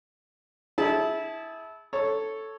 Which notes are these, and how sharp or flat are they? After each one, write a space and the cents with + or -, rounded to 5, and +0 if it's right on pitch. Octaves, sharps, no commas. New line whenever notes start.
E4 -20 G#4 +0 A5 -20
A4 +0 C#5 +0